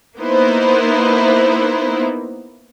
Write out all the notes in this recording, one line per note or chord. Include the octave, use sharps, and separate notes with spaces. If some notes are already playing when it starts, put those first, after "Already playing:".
A#3 B3 D#4 E4 C5